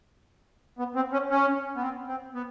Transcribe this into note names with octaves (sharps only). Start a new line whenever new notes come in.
B3
C4
C#4
C#4
B3
C4
C4
B3